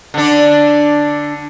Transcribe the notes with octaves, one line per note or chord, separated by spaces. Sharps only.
D3 D4